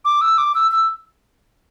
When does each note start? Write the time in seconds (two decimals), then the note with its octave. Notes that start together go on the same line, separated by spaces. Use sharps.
0.05 D6
0.21 E6
0.38 D6
0.55 E6
0.71 E6